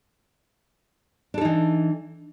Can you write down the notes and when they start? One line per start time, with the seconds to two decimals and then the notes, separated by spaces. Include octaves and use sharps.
1.34 D4
1.38 A4
1.41 D#4
1.45 E3